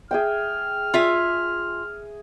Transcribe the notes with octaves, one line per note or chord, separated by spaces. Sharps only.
G#4 E5 G5 F6
F4 G#4 E5